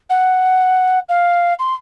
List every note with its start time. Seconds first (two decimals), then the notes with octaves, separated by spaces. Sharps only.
0.09 F#5
1.09 F5
1.59 C6